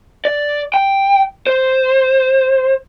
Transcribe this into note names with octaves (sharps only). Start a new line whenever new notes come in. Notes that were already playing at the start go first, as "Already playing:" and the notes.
D5
G5
C5